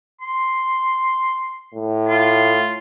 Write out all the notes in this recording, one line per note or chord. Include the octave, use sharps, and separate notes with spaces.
C6
A2
F4